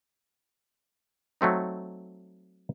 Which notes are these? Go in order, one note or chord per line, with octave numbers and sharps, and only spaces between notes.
F#3 A3 C4 D#4